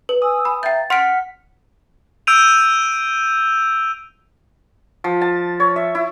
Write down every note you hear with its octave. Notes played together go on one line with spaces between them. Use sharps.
B4
G#5 D#6 E6
B5
E5 F5 G5 A#5 G6 A6
C#4 F#5 C6 F6 B6 D7
E6 G6 D7 D#7 F7
F3
A5
C#5
E5
E4